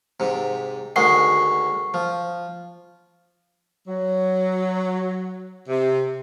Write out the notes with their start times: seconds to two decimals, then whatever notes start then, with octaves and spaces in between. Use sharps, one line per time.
0.20 G#2 C3
0.96 D2 D#3 G#3 F#5 C#6 C7
1.94 F3
3.88 F#3
5.68 C3